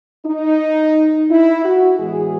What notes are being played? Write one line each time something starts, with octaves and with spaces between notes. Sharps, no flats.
D#4
E4
F#4
A2 E3 G#3 B3 G#4